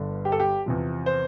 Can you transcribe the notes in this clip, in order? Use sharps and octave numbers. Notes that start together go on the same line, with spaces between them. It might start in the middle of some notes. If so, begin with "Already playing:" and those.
Already playing: G1 G2 D3
G4
A4
G4
E2 C3 F3
C5